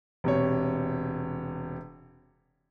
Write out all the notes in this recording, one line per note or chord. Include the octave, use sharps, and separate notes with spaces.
E1 C3 C#5